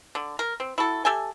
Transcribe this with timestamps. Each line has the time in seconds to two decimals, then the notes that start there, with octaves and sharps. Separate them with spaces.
0.15 D3
0.39 A#4
0.60 C4
0.78 E4 F#4 A4
1.05 G4 A4 E5 G#5